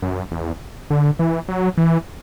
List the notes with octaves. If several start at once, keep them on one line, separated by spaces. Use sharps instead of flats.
F#2
E2
D3
E3
F#3
E3